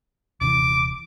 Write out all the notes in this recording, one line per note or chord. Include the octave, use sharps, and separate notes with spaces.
D#1 C3 E3 D6